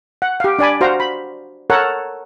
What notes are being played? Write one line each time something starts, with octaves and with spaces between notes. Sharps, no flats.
F#5
G4 F5
D4 D5 G#5 B5
F#4 C5 F5 A#5
B5
A4 A#4 C#5 F#5